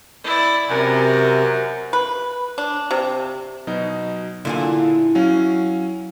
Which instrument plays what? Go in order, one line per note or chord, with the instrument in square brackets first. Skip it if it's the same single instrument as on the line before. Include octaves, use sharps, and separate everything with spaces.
[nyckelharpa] E4 D5
[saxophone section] F#2 [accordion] C3 [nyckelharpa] A#4
[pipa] B4
D4
C3
[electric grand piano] B2 F#3 D#4
[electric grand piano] A#2 D3 [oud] E4 F4 G#4
[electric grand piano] F#3 C#4 F5